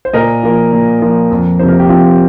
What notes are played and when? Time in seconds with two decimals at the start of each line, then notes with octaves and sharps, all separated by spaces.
0.05 C5
0.13 A#2 A#4 D#5
0.43 F3 A#3
0.72 A#2
1.02 F3 A#3
1.31 F2
1.59 C3 F3 A#3 C5
1.68 A#4
1.79 G4
1.89 F2 C4 F4